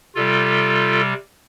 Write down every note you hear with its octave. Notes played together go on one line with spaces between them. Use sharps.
C3 G3 F4 A4